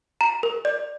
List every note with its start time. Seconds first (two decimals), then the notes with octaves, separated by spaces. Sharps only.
0.21 A#5
0.43 A#4
0.65 D5